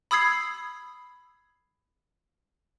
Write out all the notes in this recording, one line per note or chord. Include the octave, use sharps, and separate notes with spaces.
B5 D#6 E6 G#6 C7